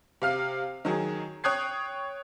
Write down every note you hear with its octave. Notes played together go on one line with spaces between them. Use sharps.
C3 F5 F6 C7
D#3 F#3 G#4
C#5 G5 D#6 F#6 G#6 C7